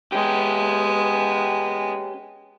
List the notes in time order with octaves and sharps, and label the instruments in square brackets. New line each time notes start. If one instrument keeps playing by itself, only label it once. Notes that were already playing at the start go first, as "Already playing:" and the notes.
[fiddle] G#3 B3 [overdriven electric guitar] C#4 G4